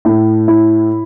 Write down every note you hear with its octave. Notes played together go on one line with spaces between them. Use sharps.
A2
E4